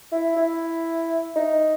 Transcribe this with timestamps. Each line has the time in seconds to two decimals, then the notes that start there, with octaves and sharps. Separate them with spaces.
0.12 E4
0.36 E4
1.36 D#4